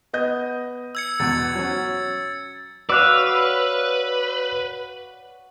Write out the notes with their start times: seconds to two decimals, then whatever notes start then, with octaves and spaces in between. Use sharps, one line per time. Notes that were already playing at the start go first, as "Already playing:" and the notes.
0.13 B3 D#5 G6
0.95 E6 G#6 C#7
1.20 E2 B2 A6 C#7
1.55 F#3 C#4
2.90 F#4 B4 C#5 D5 F5 E6 F#6